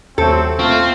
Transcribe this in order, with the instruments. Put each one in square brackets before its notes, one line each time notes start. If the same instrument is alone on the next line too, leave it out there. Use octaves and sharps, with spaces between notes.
[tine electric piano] D#2 [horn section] F#3 A3 C4 [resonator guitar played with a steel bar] A4
[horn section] A#2 A3 F4 [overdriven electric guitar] C4 [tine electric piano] C#6